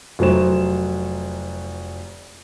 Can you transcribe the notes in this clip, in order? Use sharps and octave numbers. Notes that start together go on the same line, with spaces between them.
F1 F#3 F#4 C5 E7